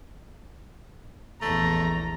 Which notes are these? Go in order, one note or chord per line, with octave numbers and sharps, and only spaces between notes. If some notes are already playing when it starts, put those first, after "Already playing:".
A#1 E2 A3 A#5